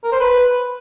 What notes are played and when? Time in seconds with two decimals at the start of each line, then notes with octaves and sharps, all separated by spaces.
0.04 A#4
0.12 C5
0.20 B4